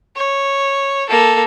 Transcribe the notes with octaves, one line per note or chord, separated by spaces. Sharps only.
C#5
A#3 A4